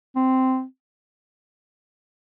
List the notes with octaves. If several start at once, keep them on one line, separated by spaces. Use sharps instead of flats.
C4